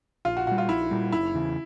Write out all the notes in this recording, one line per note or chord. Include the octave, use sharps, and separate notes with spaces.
A#1 F4
F#4
A#2 G3 F#4
F4
A#1 E4
A#2 G3
F#1 E4
E2 C#3